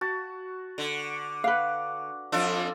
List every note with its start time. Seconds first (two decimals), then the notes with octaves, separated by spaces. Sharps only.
0.01 F#4 A5
0.78 D3
1.44 B4 F5 F#5
2.32 F2 D4 F4 A4